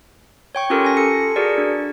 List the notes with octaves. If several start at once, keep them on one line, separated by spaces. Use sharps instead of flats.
C#5 G5 C#6
C#4 F4 G4 A4 A#4
G#5 A#6
A4 C#7
F#4 G#4 A#4 D5
D4